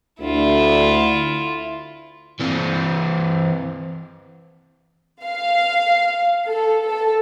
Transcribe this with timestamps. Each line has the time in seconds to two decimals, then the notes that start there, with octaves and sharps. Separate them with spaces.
0.21 D2 E4 F4
2.40 E3 C4
5.23 F5
6.46 A4
6.89 A4